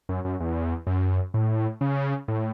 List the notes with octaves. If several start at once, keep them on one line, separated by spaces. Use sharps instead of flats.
F#2
F#2
E2
F#2
A2
C#3
A2